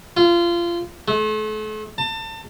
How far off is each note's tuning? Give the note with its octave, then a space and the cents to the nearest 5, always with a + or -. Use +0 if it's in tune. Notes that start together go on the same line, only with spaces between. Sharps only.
F4 -25
A3 -40
A5 +30